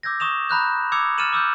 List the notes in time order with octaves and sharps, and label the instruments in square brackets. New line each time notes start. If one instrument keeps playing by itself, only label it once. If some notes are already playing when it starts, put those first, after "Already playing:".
[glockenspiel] D6 E6 G6 G#6 A#6
C#6 D#6 E7 F7
A#5 B5 F#6 G6
D6 E6 G#6 C#7 F7
F6 A6 C#7 D#7 E7 F#7
D6 E6 F6 G6